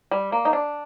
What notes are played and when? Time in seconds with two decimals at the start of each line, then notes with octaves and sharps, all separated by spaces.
0.11 G3
0.32 A#3
0.45 D#4
0.53 D4